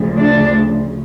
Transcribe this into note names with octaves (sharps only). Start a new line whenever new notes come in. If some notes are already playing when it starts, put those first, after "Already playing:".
Already playing: D2 C#3 F3
D4